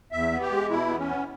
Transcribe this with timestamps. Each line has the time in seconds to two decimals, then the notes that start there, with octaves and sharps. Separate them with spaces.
0.12 E2 E5
0.31 B3
0.41 G4
0.51 G#3
0.70 B2 E4
0.88 E2 B3
0.98 C#4
1.08 B3